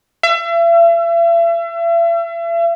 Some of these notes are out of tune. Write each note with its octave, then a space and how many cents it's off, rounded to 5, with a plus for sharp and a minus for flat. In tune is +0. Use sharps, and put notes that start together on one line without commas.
E5 +40